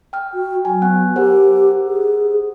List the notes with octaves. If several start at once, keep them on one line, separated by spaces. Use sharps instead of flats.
G5 F6
F#4
F#3 G#5
B3 F#5 F#6
G4 A#4 C5 F#5
G#4